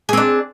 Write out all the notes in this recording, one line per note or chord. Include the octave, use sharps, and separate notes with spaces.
C4 D4 G#4